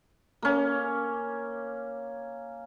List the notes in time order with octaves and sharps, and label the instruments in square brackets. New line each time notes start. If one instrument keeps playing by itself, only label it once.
[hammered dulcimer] A#3 C#4